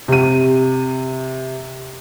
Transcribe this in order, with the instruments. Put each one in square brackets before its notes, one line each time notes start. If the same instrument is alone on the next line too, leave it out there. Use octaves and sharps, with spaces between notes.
[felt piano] C3 D#7